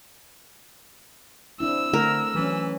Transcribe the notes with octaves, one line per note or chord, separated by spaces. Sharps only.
C4 D4 E4 E6
D3 A3 A#4
E3 F#3 C#4